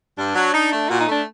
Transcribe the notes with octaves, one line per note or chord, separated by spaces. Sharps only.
G2 D4
F#3
D#4
A3
A#2 F#4
D#4
A3 D4